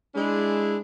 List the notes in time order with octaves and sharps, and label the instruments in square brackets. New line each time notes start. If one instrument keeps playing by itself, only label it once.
[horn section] G#3 D4 E4